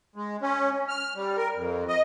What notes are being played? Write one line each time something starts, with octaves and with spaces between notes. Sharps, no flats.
G#3
C#4
F6
G3
A#4
F2
D#5